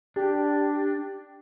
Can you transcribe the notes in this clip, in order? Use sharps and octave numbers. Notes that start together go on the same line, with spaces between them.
D4 G4